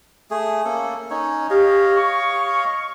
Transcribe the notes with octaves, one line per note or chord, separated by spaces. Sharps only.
A3 G#4
A#3 C#4 A4
C#4 D#4 C#5
G4 C#5 D#5 F5
C#6